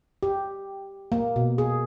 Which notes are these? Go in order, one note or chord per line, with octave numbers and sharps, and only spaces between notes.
G4
A#3
B2
G#4